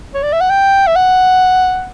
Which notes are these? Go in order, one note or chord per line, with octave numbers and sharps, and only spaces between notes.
C#5
D5
E5
F#5
G5
E5
F#5